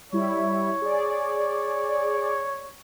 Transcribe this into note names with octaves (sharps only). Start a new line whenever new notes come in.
G3 E4 C#5
G#4 D5